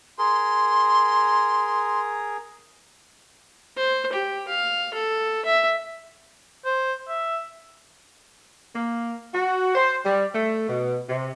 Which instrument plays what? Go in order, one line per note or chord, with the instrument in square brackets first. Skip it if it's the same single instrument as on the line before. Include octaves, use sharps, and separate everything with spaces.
[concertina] G#4 A#4 [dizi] C6
[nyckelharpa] C5
G4
F5
A4
E5
[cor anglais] C5
E5
[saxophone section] A#3
F#4
C5
G3
A3
B2
C3